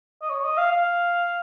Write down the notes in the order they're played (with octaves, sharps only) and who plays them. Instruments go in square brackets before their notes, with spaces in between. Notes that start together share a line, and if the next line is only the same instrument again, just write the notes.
[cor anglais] D#5
C#5
C#5
D#5
F5
F5